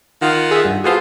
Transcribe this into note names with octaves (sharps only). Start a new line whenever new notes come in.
D#3 F4 F#5
G#4 E5
G2
B3 F4 F#4 G#4 A4 C5